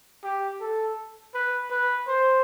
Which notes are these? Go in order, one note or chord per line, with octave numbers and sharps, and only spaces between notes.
G4
A4
B4
B4
C5